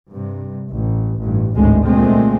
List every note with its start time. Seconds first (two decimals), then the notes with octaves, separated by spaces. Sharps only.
0.11 G2 C3
0.69 A1
1.20 A1 G2
1.55 G#1 D2 A2 G#3
1.84 C2 A#2 G#3 A3 C4